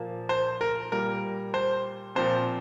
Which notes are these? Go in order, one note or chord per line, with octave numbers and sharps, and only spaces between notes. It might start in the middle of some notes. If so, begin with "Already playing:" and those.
Already playing: A#2 F3 A#3
C5
A#4
A#2 G3 A#3 A#4
C5
A#2 F3 C4 C5